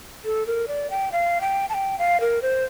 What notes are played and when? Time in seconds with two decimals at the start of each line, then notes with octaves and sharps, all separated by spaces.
0.25 A4
0.47 A#4
0.68 D5
0.90 G5
1.12 F5
1.41 G5
1.70 A5
1.74 G5
1.99 F5
2.20 A#4
2.42 C5